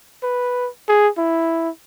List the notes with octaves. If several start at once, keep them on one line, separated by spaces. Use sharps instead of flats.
B4
G#4
E4